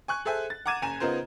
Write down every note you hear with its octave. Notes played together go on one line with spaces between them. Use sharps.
G#5 C#6 F#6
G#4 A4 C5 E5 G#5
A6
F#5 A#5 D6 G#6 D#7 E7
F#1 G#5 A#5 D#7 E7
C#3 B3 D#4 F4 A#4 C5